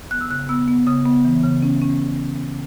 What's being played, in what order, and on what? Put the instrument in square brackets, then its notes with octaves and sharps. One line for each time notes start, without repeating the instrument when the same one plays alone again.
[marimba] B3 F#6
E6
C#3 F#6
B3 E6
B3
C#3 D#6
B3
E3
C#3
C#4
C#4